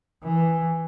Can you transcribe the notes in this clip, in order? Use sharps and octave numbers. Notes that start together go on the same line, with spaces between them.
E3